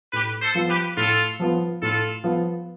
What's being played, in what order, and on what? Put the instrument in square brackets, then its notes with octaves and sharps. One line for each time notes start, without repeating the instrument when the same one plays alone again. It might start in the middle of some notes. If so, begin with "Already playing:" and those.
[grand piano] A2 [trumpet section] G4 B4
[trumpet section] A4 C5
[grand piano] F3 B3 F4
[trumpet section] G4 B4
[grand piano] A2 [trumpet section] F4 A4
[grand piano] F3 B3 F4
[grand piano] A2 [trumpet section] F4 A4
[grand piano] F3 B3 F4